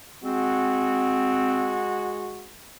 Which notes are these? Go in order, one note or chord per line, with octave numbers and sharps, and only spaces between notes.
G#3 C4 F#4